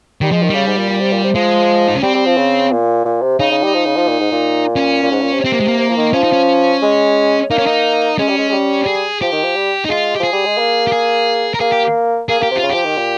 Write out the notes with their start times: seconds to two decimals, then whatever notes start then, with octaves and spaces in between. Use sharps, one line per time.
0.21 D#3 G3
0.31 F3 G#3
0.43 D#3
0.50 C#3 G3
0.67 G#2
0.77 A#2
0.89 A#2
1.00 C3
1.12 A#2
1.24 C3
1.35 F3 G#3
1.88 D#4
1.96 C#4
2.02 G3 C4
2.15 G3
2.26 F3
2.37 C#3
2.71 A#2
3.05 A#2
3.22 C3
3.39 C#3 D#4
3.51 C#3
3.63 G3
3.74 F3
3.86 C#3
3.96 F3
4.08 A#2
4.20 G#2
4.31 A#2
4.76 C#4
5.03 A#2
5.11 G#2
5.21 A#2
5.33 C3
5.45 C4
5.52 A#3
5.60 G#3
5.68 A#3
5.78 C3
5.89 F3
5.97 D#3
6.13 F3 C#4
6.23 D#4
6.33 C#4
6.82 G#3
7.51 A#3 D#4
7.58 C#4
7.67 D#4
8.19 G#3 C#4
8.28 G3
8.38 G#3
8.49 G#3
8.52 G3
8.87 G#4
9.21 F3 G4
9.32 D#3
9.44 F3
9.56 G3
9.85 D#4
9.89 G#3 F4
10.16 G4
10.20 F3 G#4
10.33 G3
10.45 G#3
10.58 A#3
10.87 G4
10.92 G#4
11.54 A#4
11.60 A#3 G#4
11.72 G4
12.29 A#3 G#4
12.40 A#3 G4
12.51 C3
12.56 F4
12.63 C#3
12.69 F3 G4
12.85 D#3
12.98 A#2